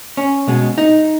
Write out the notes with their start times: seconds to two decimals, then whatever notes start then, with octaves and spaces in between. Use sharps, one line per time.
0.17 C#4
0.47 B2 G#3 B3
0.78 D#4